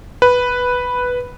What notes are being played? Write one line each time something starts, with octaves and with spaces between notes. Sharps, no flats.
B4